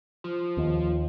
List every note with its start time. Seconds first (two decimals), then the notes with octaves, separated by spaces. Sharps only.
0.24 F3
0.57 D#2